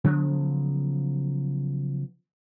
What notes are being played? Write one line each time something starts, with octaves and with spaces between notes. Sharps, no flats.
C#3 F3 F#3 B3